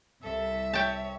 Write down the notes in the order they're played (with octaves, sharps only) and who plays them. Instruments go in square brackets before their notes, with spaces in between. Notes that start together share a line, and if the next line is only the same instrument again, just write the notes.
[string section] C2 [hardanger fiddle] A4 [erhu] E5
[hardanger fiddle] C#5 [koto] G5 A5